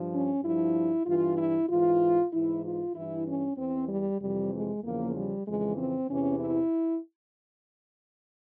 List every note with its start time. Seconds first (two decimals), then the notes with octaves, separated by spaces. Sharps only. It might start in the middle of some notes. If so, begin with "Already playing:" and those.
Already playing: G2 F3
0.12 C#4
0.43 G2 F3 E4
1.06 G2 E3 F4
1.37 E4
1.69 G#2 E3 F4
2.32 G#2 E3 E4
2.64 F4
2.95 G2 E3 E4
3.26 C#4
3.57 E2 E3 C4
3.89 G3
4.21 F2 C3 E3 G3
4.52 G#3
4.83 E2 C#3 F3 A#3
5.16 G3
5.47 F2 C#3 E3 G#3
5.78 C4
6.10 E2 C3 E3 C#4
6.41 E4